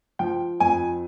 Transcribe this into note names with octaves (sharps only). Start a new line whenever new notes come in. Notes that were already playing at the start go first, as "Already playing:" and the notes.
F3 G5
F2 G#5